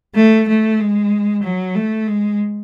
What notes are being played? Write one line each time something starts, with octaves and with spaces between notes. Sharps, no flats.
A3
A3
G#3
F#3
A3
G#3